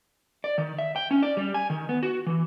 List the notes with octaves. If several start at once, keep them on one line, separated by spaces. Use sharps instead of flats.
D5
D#3
E5
G5
C#4
D5
G3
G#5
D#3
B3
F#4
E3